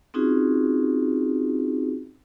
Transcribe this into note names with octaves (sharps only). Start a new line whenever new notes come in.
C4 C#4 D#4 F4 F#4 G#4